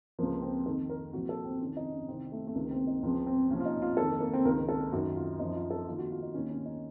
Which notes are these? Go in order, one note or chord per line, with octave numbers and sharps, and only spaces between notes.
C#2 C3 F3 A#3
C4
F2 D#3 A4
A#4
C2 A#2 F3 F#4
A4
C4
F2 C3 D#3 C#4
D#4
C#4
C2 C3 D#3 C4
A3
A3
C#2 C3 D#3 A#3
C4
D#4
C#2 C#3 F3 C4
C4
C2 A#2 F3 C#4
F4
D#4
F4
F2 D#3 A4
A#3
A#3
C4
C#2 C3 D#3 A#4
A4
F#2 D#3 F#4
F4
F#2 F3 D#4
F4
A4
D#2 D#3 F4
F#4
F4
D#4
D#2 D#3 C#4
C#4
D#4